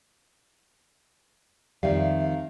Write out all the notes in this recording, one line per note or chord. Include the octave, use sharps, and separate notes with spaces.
F2 D#3 G3 E5 F5